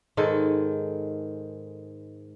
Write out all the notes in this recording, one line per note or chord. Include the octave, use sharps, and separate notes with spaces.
G#2 D#3 G#3 A4